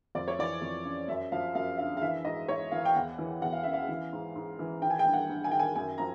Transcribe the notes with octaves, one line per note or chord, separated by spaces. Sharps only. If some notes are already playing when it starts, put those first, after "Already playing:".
F2 D5
C#5
E3 D5
F2
C#3
F#2 E5
F3 F5
F#2 F5
D3 F5
F5
E3 E5
G#2 D#5
G#2 C#5
E3 F5
G5
E2 F#5
E3
E2 F#5
F5
C#3 E5
F5
E3
G#2
G#2
E3
D#3 G5
G#5
G5
G2
F#5
G2
G#5
D#3 G5
G#5
F#2 G#5
F3 A#5